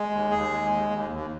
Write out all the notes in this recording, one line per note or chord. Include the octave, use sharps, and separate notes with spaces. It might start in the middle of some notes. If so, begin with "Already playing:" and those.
Already playing: G#3
D#2
D#2 G#4
G#3
D#2
D#2
D#2